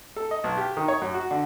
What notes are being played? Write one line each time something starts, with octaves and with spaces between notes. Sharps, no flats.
A4
D#5
B1
G4
D#3
C#5
F#2
F#4
D3